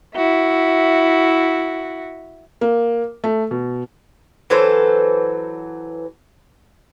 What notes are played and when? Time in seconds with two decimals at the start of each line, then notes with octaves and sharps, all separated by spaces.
0.13 E4 F#4 E5
2.61 A#3
3.24 A3
3.51 B2
4.50 E3 F#3 A4 C5